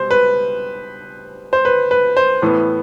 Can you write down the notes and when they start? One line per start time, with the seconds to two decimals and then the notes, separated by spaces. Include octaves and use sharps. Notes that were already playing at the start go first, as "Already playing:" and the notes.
Already playing: B2 G3 C5
0.11 B4
1.53 C5
1.65 B4
1.91 B4
2.17 C5
2.42 A2 E3 B3